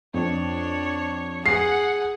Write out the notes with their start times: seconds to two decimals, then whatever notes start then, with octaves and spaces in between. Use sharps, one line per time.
0.14 F2 D4 C#5
1.46 G#4 F#5 C7